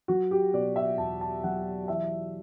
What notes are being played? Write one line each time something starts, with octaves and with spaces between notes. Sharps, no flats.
F#3 F#4
G4
B2 D5
E5
E2 A5
A5
F#3 F#5
E3 E5